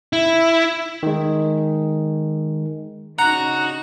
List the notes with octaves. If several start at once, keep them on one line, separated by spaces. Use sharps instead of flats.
E4
D#3 G#3
C#3 D4 D#4 F#4 F#5 A#5 F#6